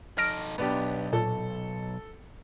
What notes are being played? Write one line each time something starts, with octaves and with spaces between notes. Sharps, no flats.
D#4 A4 F6 A#6 D7
B1 G#2 B3 D4 G4
A#2 A4